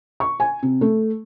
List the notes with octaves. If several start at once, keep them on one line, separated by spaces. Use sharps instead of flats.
C#6
G#5
C3
A3